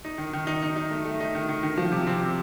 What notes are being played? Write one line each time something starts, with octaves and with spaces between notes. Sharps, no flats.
D#4
D#3
D#3
D#4
D#4
D#4
A3
A3
D#4
D#3
D#3
D#3
F3
C3
C4
C3